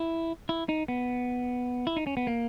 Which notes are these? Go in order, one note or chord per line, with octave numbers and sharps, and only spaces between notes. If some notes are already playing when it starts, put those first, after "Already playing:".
Already playing: E4
E4
D#4
B3
E4
D#4
C#4
B3
A#3